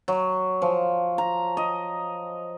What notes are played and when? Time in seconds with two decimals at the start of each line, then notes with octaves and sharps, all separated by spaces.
0.08 F#3
0.62 F3
1.18 A#5
1.57 D#5